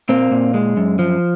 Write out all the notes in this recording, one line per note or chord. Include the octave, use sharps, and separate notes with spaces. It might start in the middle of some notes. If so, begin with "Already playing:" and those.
A#2 A#3 C4
A#2
G#3
F#2
F3